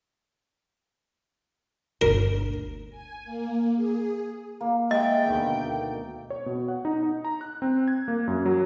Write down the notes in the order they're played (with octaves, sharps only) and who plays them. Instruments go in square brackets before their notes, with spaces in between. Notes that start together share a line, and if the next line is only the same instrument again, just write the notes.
[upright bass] G1 D2 [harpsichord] A#4
[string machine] G#5
A#3
G#4
[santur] A#3
[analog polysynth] G#3 [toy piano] D#5 [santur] E5 [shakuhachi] G5
[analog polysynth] D2 B2 D#3
[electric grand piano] C#5
B2
F#5
D#4
D#4
A#5
F#6
C4
G#6
A#3
F#2
F#3